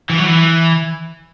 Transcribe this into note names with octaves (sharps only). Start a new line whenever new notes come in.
E3
F#3
E3